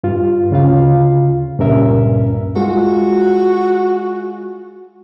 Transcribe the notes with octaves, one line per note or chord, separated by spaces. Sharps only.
G2 F4
D2 C#3 F4 F5
C#2 G2 A#2 C#4 A#4 E5
G#3 F4 F#4